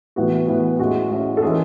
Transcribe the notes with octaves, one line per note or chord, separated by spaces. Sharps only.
A2 E3 B3 F#4
A2 E3 B3
A2 G#3 C#4 F#4
A2 G#3 C#4
A4
E3 G#3 C#4 G#4